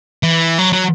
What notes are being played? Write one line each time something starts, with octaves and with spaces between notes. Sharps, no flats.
E3
F#3
F#3